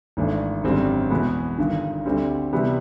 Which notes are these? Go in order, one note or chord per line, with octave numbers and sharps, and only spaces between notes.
G#1 G#2 E3 A3 D4
G#1 F#2 D3 G3 C4
E2 B2 G#3 B3
G1 G2 D#3
D2 D3 G3 C4
C3 E3 G3 B3